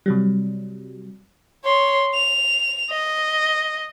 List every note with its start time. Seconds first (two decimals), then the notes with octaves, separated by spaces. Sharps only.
0.06 C3 F#3 G3
1.65 C#5 C6
2.14 F7
2.91 D#5